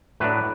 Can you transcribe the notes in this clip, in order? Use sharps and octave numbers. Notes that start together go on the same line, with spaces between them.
A2 F#3 D4 B4